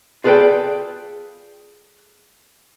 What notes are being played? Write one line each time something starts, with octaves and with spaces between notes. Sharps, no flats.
F4 G#4 A4 B4 D5 G5